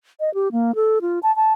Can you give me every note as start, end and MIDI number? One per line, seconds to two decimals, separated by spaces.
0.20 0.33 75
0.34 0.52 67
0.52 0.75 58
0.75 0.99 69
1.02 1.19 65
1.23 1.34 81
1.36 1.53 81